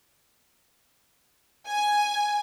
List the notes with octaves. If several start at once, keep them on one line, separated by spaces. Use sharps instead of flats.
G#5